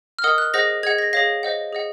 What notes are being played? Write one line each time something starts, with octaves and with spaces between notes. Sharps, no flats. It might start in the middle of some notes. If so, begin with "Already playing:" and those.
F6
A#4 D#5 F#5 D#6
F#6
G#4 C5 D#5 F#5 A#6
G#4 D#5 F#5 G#6
A#6
G#4 C#5 F5 A#6
C5 D#5 F#5
G#4 D#5 F#5